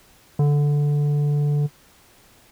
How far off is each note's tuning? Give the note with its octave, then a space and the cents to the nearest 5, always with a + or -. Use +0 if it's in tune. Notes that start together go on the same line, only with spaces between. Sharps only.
D3 -5